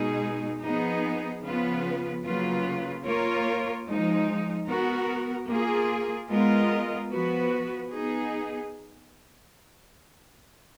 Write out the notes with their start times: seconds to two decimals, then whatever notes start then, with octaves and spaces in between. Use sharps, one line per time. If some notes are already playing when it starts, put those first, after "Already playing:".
Already playing: B2 G#3 D#4 G#4
0.63 F3 B3 D#4 G#4
1.44 C#3 F3 B3 F4 B4
2.25 C#3 F#3 A#3 F4 B4
3.05 A#3 F4 A#4 C#5
3.87 F3 G#3 D#4
4.68 B3 F#4 A#4
5.49 A#3 F4 G#4
6.30 G#3 B3 F4 A#4 D#5
7.11 F3 B3 F#4 B4
7.91 B3 D#4 G#4